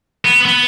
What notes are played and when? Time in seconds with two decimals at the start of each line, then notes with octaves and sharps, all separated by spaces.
0.25 B3
0.45 B3